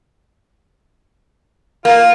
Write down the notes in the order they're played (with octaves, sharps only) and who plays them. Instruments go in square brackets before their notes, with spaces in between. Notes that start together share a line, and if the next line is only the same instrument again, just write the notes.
[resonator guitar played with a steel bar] A#3 [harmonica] F4